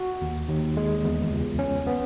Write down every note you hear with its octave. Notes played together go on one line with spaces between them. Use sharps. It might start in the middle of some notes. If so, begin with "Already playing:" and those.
Already playing: F#4
D#2
D#2
G#3
E2
C#2
C#4
B3